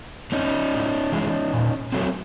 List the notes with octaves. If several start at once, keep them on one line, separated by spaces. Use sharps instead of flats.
A3 C4 C#4 D#4
A2
E3 G#3
A#2
F#3 A3 C4